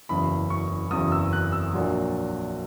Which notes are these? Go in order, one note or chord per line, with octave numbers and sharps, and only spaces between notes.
F#1 E2 C#3 B5
C#6
F#1 E2 C#3 D#6
E6
F#6
E6
A#1 A#2 F#3